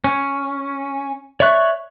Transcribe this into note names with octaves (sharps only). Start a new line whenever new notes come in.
C#4
C#5 D5 E5 C#6 F#6